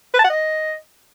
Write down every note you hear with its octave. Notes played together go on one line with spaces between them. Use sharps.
B4
A5
F#5
D#5